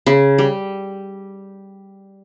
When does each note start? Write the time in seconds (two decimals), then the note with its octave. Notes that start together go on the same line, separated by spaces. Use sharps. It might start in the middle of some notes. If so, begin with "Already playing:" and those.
0.06 C#3
0.38 G3